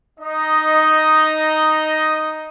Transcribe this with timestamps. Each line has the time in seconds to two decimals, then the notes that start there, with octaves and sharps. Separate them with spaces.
0.20 D#4 D#5